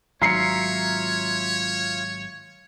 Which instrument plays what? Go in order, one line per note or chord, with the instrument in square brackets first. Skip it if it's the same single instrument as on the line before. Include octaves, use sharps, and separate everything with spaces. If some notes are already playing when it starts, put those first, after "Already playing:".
[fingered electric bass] G#1 F#3 [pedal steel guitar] F4 E5 [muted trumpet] C#5 [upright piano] A#5 C7 C#7